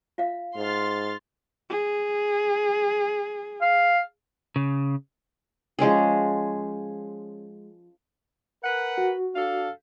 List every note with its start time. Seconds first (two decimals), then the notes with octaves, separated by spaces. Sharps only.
0.18 F4 E5 F5
0.56 G#2 C6 F6 A6
1.69 G#4
3.61 F5
4.56 C#3
5.79 F3 G#3 C#4 G#4
8.63 A#4 B4 F#5
8.98 F#4
9.35 D4 A4 F5